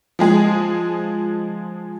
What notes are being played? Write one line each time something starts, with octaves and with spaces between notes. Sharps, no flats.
F3 G#3 G#4